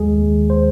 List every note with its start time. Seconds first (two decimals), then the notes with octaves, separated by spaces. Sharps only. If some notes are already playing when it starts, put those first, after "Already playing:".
Already playing: D#2 D#3 G#3 G#4
0.19 D#2 D#3
0.50 C5